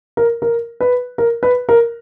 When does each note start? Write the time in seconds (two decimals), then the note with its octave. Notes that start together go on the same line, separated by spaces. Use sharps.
0.17 A#4
0.42 A#4
0.80 B4
1.18 A#4
1.43 B4
1.69 A#4